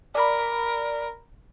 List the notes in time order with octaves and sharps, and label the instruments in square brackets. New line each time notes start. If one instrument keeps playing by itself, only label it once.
[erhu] A#4 [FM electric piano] D5 B5